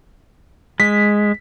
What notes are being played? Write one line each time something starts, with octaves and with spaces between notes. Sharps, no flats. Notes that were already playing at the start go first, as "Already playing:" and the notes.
G#3 B6